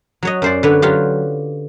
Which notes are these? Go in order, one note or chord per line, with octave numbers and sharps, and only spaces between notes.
F#3 C#5 D#5
F#2 C5 D5
D3 B4 C#5
F#3 F4 G4